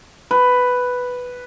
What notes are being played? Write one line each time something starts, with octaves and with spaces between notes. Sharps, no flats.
B4